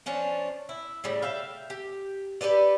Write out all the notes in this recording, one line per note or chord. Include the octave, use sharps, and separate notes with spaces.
F3 C#4 D4
E4
A2 C#3 G3
E5 F5 G5
G4
G4 A4 B4 D5